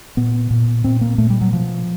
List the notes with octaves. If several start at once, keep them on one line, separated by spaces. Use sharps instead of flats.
A#2 B3
A#2
A#2 C4
A#3
A#2 A3
G3
F#3
B2 F3